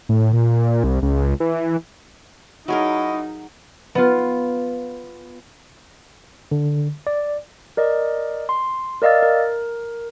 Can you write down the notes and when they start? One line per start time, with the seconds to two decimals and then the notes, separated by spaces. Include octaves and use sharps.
0.09 A2
0.33 A#2
0.84 C2
1.02 C#2
1.40 E3
2.68 F#3 D#4 E4 G#4 A#4 C#5 D#5
3.95 B3 F4
6.51 D3
7.07 D5
7.77 A#4 D5 D#5
8.49 C6
9.02 A#4 D5 D#5 F5 E6 A6
9.23 A#4